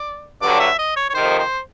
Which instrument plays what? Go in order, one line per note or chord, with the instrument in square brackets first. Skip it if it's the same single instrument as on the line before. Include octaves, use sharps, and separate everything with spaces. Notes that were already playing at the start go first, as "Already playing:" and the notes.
Already playing: [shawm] D5
[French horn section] G2 D3 F#3 [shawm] D5
[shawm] E5
D#5
C#5
C#5
[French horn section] F2 C3 D#3 [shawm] C5
[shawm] C5